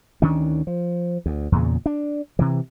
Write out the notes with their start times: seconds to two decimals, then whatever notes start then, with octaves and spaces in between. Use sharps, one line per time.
0.22 D2 D#3 C#4 D4
0.67 F3
1.26 D2
1.52 E2 A#2 C#3
1.86 D4
2.39 C3 E3